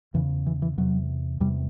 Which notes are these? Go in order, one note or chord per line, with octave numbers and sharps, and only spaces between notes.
E2 C#3 E3
E3
E3
E2 C3 F#3
E2 C3 G3